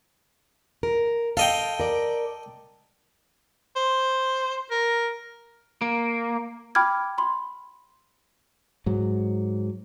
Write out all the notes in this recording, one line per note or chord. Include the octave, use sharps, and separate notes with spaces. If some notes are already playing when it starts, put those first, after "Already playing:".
A#4
A4 D#5 F5 G5
A#4 D5
C5
A#4
A#3
G5 B5 D6 F6 G#6
B5 C6
G#2 F#3